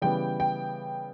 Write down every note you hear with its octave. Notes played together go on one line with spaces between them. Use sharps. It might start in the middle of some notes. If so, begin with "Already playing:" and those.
C#3 E3 G3 B3 G5
G5